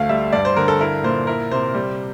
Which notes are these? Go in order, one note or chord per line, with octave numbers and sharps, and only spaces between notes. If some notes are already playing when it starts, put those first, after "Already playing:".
Already playing: D2 A3 F5
G3 E5
G2 D5
C5
D3 A#4
A4
E4 A#4
A#2 C5
E4 A#4
C3 C5
G3